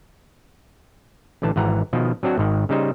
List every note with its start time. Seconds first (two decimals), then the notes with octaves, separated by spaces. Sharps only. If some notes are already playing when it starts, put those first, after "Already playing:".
1.42 A1 D3 E3 A5
1.56 G#1 E3 F#5 A#5
1.93 B2 D#3 F3
2.23 F#3 C4 D4 F#4
2.38 G#1 D#3
2.69 C#3 G3 D#4 C5